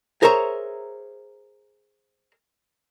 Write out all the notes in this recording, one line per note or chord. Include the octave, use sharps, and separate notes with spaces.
G#4 A#4 C5 C#5 E5 A#5